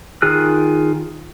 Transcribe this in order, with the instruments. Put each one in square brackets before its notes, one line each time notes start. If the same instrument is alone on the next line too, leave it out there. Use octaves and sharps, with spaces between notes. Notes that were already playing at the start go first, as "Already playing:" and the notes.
[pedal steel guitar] D#3 F4 G#4 F6 F#6